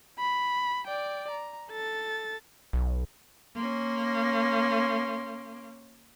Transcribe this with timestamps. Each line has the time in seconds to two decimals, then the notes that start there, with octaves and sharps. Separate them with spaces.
0.19 B5
0.87 D5 G5
1.31 A#5
1.70 A4 A6
2.73 B1
3.56 A#3 C#4 C6